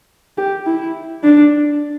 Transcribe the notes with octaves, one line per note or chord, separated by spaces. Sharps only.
G4
E4
D4